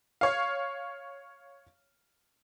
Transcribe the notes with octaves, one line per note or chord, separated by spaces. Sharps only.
C#5 F5